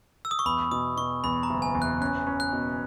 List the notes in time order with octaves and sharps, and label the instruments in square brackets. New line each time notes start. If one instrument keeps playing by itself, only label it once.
[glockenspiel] E6
D#6
C#6
[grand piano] E2 [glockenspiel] B5
[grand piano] B2 [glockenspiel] D#6
[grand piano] B2 [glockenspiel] C#6
[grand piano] E2 [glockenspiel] B5
[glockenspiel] A#5
[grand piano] F#1
[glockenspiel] G#5
[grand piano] E2
[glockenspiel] F#6
[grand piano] C#4 [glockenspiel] F#6
[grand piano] C#4
[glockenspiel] F#6
[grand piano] B2